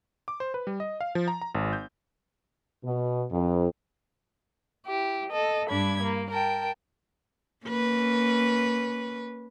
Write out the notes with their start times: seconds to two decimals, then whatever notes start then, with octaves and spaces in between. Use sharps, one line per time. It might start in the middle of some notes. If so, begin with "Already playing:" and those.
0.28 D6
0.40 C5
0.54 B4
0.67 G3
0.80 D#5
1.01 F5
1.15 F3
1.28 A#5
1.41 A#5
1.55 G#1
1.73 G6
2.84 B2
3.31 F2
4.87 E4 G4
5.29 A4 D#5
5.70 G2 D4 B5 G#6
6.02 A#3
6.31 A#4 G5 A5
7.65 A#3 C#4 B4